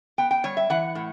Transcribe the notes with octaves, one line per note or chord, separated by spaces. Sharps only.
B3 G5
G5
G3 C#5
E5
E3 F#5
A2